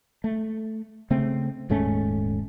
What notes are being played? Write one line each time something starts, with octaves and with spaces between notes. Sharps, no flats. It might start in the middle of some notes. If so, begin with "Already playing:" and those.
A3
C#3 A3 C4
D#1 G#2 A3 C#4